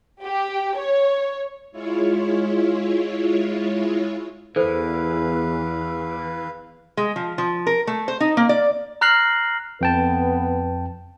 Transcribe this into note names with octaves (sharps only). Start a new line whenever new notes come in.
G4
C#5
G#3 E4 F4 C#5
E2 E3 A4 B4 C5 F5
G#3
F3
F3
A#4
A3
C5
D#4
A#3
D5
A#5 F6 F#6 A#6 C7 F#7
F2 B3 B4 G5 A5